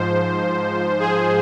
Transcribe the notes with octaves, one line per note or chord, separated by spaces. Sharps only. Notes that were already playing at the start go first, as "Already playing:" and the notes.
Already playing: G#2 F3 C5
G#4